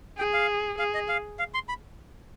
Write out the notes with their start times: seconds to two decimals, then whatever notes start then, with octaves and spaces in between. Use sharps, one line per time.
0.18 G#4 G5
0.33 F5
0.79 G#4 F5
0.94 D#5
1.08 F5
1.39 F5
1.54 C6
1.69 B5